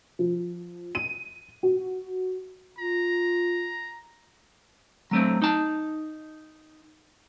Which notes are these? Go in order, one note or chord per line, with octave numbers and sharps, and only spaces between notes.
F3
D#7
F#4
F4 A#5
F#3 A3 C4
D#4 A5